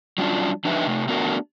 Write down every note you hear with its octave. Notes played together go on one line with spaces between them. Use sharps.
F#3 G3 C#4 D4 F4
F3 D4 D#4 G4 B4 E5
C3 A3
A3 B3 D4 F#4 A#4